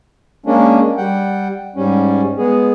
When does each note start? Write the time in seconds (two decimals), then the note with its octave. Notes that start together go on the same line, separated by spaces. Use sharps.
0.46 G#3 A#3 C#4 D4
0.97 G3 F#5 G5
1.76 G#2 G3 C#4
2.38 G#3 B3 G#4